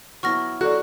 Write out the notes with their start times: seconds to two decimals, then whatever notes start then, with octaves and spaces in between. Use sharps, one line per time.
0.23 F#3 B3 E4 C#6 F6 A#6
0.61 F#3 F#4 A4 D5 F#6